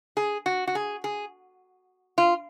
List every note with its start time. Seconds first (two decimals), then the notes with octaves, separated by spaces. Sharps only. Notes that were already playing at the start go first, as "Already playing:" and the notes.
0.17 G#4
0.46 F#4
0.67 F#4
0.75 G#4
1.04 G#4
2.18 F4